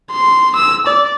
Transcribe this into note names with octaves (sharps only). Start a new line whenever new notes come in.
C6
E6
D5